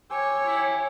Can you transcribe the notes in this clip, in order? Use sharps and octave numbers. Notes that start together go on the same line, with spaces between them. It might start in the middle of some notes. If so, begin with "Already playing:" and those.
G4 C#5 G5 G#5 E6
E4